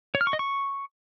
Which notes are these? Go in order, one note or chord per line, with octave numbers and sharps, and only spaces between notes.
C#5
F6
C#6
D#5
C#6